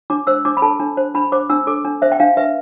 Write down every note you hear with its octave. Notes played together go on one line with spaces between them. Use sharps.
D4 D6
C5 E6
D4 D6
B5
A4 A5
D4
C5
D4 B5
C5 D6
D4 E6
A4 D6
D4
C5 E5
G5
D4 F5
B4 E5